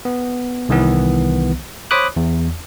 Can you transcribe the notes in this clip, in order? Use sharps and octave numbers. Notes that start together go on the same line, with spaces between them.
B3
C2 D#3 E3 B3
C5 C#5 B5 D6 D#6 F#6
E2